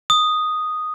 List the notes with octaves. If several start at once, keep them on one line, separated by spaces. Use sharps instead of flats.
D#6